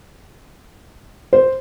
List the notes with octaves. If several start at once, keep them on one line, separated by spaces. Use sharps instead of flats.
C5